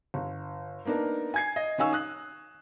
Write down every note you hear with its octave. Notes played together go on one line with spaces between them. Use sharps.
G1
A#3 B3 D4 D#4 A#4
G#5 G#6 C7
D#5
D#3 C#4 F5 G#5 C#6 E6
D#6 F#6